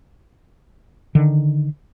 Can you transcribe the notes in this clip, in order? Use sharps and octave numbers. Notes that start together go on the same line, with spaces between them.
D3 D#3